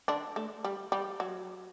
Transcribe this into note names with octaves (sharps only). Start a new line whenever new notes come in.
D3 D4
A3
G3
G3
F#3